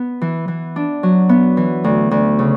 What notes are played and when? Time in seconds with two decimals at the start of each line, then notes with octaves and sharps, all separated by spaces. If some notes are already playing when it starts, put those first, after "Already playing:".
Already playing: B3
0.22 E3
0.48 E3
0.76 D4
1.03 F#3
1.29 B3
1.57 E3
1.84 D2
2.11 D2
2.39 C#3